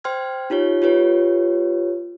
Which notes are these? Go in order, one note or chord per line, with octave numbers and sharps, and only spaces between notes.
C5 G5 C6 F6 G#6
D#4 F4 G4 C#5
F4 G4 B4 C#5